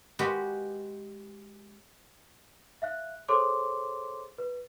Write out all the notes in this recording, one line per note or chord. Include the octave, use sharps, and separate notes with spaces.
G#3 F#4 G4 B4
E5 F5 F#6
G#4 A4 C5 C#5 C6 D6
B4